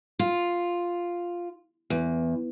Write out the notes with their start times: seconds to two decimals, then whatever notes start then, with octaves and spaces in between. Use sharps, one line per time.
0.19 F4
1.90 E2